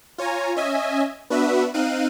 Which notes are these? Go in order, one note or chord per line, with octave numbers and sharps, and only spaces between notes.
F4 C#5 G#5 A#5
C#4 D#5 E5 G#5
B3 D4 F#4 B4 E5
C4 D#4 F5 F#6 D#7